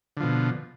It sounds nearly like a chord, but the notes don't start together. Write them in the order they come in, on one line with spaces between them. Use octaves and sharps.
D3 F3 B2